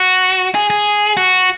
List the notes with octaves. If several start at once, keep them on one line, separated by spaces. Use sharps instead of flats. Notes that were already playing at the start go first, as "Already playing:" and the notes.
Already playing: F#4
G#4
G#4
F#4